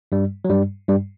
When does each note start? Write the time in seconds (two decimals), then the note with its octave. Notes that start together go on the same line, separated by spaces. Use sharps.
0.12 G2 G3
0.45 F#3
0.50 G2 G3
0.88 G2 G3